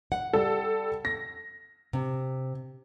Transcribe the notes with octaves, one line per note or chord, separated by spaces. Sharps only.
F#5
G3 A4
A#6
C3